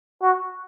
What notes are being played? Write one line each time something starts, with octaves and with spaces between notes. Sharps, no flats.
F#4